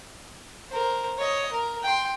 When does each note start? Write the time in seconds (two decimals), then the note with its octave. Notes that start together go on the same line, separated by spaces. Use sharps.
0.70 A#4 C5
1.18 C#5 D#5
1.52 A#4
1.83 G5 C6